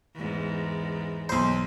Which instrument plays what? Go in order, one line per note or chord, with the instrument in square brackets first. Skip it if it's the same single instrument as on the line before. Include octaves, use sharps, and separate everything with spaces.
[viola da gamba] E2 G#2
[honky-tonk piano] B1 C6 [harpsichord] C5